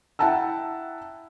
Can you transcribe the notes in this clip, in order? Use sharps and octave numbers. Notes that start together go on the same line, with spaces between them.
E4 F#5 G5 A5 A#5 E6